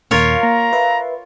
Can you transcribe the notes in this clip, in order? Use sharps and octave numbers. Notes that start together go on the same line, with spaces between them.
D#2 A#2 F4 A#4 C#5 F5
A#3 A#5
B4 E5